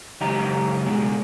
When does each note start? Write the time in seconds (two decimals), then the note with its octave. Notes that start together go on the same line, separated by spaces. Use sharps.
0.21 C#2 F#2 D#4 G4 A#5
0.86 B2 G#3 G#4